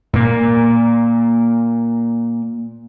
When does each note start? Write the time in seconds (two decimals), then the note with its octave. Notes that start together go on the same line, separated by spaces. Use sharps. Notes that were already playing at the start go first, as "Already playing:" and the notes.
0.13 A#2 A#3